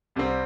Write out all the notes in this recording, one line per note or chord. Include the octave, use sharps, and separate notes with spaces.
C2 C3 G3 C4